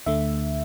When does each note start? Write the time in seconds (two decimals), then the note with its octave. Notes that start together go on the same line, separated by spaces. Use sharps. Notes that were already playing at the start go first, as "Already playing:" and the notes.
0.06 D2 D3 A3 E5